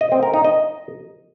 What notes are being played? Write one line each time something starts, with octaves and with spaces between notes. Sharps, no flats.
D#5
C4
A#4
D#4
D#5